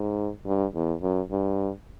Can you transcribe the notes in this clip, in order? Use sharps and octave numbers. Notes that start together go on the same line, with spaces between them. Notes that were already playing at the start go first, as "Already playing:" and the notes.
Already playing: G#2
G2
E2
F#2
G2